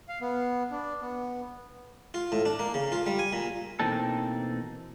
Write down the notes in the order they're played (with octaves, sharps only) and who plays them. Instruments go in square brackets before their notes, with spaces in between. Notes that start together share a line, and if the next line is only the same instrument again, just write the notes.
[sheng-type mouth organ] F5
B3
D4
B3
[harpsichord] F4
A2
D4
A#3
C#3
F4
G3
G#5
A#2
[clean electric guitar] B2 E3 A#3 C4 D#4 A4